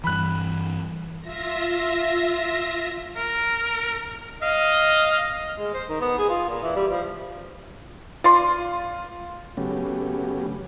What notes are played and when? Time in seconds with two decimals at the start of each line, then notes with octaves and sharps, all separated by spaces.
0.04 G2 E3 B5 F#6
1.21 F4 E5 A#6
3.16 A#4
4.43 D#5 F5
5.58 G#3
5.74 C5
5.89 D#3
6.01 B3
6.18 G#4
6.30 F4
6.49 A#2
6.63 E3
6.76 G3
6.92 F3
8.24 F4 D5 C6
9.57 C#3 F#3 A3 B3 C#4 G4